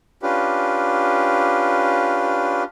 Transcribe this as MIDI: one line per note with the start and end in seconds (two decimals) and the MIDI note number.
0.23 2.63 61
0.23 2.63 62
0.23 2.63 65
0.23 2.63 67
0.23 2.63 71